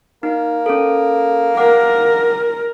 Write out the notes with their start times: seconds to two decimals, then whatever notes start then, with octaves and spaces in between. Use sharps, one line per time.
0.23 A#3 D#4
0.66 C#4 A4
1.57 A#4 F#5 D6